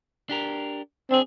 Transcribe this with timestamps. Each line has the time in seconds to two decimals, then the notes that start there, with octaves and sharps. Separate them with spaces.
0.29 D4 G4 A#4
1.11 C4 D4 G#4